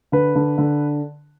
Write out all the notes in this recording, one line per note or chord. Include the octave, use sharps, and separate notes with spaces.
D3 B4
D3
D3